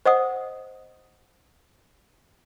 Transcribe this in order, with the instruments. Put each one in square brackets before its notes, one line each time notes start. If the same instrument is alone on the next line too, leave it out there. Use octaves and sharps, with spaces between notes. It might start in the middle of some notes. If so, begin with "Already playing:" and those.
[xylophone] C5 D#5 F#5 D#6